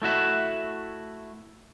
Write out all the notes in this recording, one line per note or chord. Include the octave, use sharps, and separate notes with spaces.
A3 E4 F#4 E5